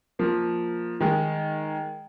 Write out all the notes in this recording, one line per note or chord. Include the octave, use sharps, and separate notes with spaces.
F3 A#3
D#3 G#3